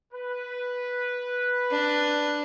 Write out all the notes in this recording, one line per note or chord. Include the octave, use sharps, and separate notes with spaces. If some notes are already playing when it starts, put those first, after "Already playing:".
B4
D4